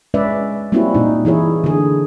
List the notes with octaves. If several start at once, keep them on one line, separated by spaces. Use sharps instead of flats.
G#3 C#4 B4 D5 E5
G3 A#3 C4 C#4 E4 F#4
A#2 D#4
E3 E4 G#4 C#5
D3 G#4